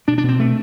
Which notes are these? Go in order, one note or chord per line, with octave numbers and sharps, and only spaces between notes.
B2 D4
D4
B2
C4
B2 A3